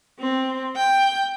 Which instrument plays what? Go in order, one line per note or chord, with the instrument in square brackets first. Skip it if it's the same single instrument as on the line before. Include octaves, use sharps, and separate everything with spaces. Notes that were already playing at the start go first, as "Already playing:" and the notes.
[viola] C4
G5